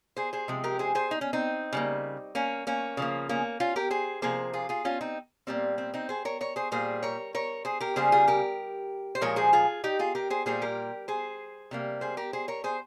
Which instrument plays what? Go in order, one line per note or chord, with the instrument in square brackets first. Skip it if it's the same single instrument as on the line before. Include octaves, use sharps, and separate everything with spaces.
[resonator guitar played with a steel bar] G#4 C5
G#4 C5
C3 F3 G#3
G4 A#4
G#4 C5
G#4 C5
D#4
C#4
C4 D#4
C#3 G3 A#3
A#3 C#4
A#3 C#4
C#3 F3 A#3
A#3 C#4
C#4 F4
G4 A#4
G#4 C5
C3 F3 A#3 G#4 C5
F4 G#4
F4 G#4
C#4 F4
C4 D#4
A#2 G3 A#3 C4
C4
C4 D#4
G#4 C5
A#4 C#5
A#4 C#5
G#4 C5
A#2 G3 A#3 G#4 C5
A#4 C#5
A#4 C#5
G#4 C5
G4 A#4
C#3 G3 A#3 G#4 C5
F4 G#4
G4 A#4
C5
A#2 F3 G#3 A#4 C#5
G#4 C5
F4 G#4
D#4 G4
F4 G#4
G4 A#4
G#4 C5
A#2 G3 A#3 G#4 C5
G4 A#4
G#4 C5
C3 G3 A#3
G#4 C5
G4 A#4
G#4 C5
A#4 C#5
G#4 C5